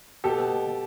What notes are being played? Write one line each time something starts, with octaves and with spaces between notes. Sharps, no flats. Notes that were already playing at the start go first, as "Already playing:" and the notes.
B2 G4 A4
B2
B2
B2